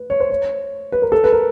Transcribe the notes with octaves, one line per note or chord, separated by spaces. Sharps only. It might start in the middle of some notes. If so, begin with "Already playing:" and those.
Already playing: B4
C#5
C5
C#5
B4
A#4
A4
B4
A#4